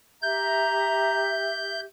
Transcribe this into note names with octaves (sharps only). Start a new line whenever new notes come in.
G4 E5 A#5 G6